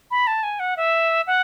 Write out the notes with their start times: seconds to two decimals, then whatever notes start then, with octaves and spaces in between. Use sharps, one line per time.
0.11 B5
0.27 A5
0.43 G#5
0.60 F#5
0.77 E5
1.27 F#5